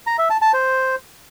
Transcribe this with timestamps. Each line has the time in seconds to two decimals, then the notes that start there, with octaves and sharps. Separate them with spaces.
0.07 A#5
0.18 E5
0.30 A5
0.42 A5
0.53 C5